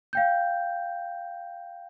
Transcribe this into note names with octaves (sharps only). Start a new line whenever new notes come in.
F5 G5 G6